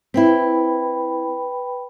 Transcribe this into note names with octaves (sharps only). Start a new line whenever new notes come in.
C4 E4 B4 G5 B5